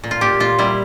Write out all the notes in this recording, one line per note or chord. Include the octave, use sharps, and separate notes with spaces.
A#2
F4
A#2 G4
A#2 F4
G3 E4